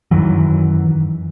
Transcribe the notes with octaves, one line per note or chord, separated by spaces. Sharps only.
F#2 D#3 E3 F#3